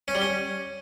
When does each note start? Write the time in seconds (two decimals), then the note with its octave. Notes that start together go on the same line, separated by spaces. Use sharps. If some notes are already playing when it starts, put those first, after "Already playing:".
0.08 C#4
0.15 G3
0.22 C#4